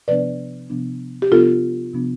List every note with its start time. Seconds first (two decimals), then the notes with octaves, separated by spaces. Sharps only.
0.08 C3 F3 B3 D4 B4 D5
0.70 C3 F3 B3 D4
1.22 G4
1.32 C3 F3 B3 D4 F4 A4
1.94 C3 F3 B3 D4